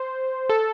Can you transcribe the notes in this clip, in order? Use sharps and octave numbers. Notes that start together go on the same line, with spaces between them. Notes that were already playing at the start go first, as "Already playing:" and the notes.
Already playing: C5
A4